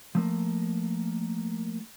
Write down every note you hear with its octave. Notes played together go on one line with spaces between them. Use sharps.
F3 A3 A#3